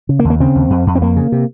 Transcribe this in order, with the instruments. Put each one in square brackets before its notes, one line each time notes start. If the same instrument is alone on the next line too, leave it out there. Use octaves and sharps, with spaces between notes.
[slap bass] C#3
A#3
D#2
A#3
C#3 C4
D#2
F2
F2
C4
F2 A#3
C#3
C3